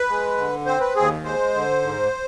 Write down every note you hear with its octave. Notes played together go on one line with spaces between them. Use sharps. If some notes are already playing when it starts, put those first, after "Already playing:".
Already playing: B4
G#3
D3
C4 C5
B4
D#2 G#4
G#3 C5
D3
G#2